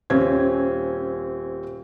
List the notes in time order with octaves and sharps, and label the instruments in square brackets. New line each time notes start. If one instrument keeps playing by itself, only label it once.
[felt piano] D#1 C4 C#4 G#6